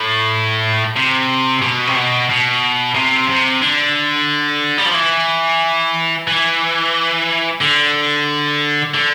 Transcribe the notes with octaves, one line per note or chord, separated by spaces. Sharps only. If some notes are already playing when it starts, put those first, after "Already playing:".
Already playing: A2
C3
B2
C3
B2
B2
C3
C3
D3
G3
F3
E3
E3
D3
D3